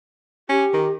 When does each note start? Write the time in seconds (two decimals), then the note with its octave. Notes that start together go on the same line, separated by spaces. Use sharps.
0.49 C#4 G4
0.74 D#3